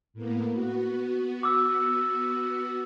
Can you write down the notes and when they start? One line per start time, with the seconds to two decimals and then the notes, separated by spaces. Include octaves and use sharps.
0.14 A2 A#3 B3
0.54 B3 F#4
1.43 D6 E6